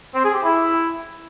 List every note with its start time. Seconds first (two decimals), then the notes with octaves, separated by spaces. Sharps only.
0.14 C4
0.24 G#4
0.34 G4
0.44 E4